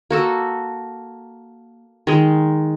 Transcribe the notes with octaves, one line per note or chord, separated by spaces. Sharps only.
A#3 F#4 A4
D#3 G#3